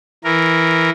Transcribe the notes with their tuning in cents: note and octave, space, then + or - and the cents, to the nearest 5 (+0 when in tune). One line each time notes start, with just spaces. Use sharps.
E3 +0 A#4 +0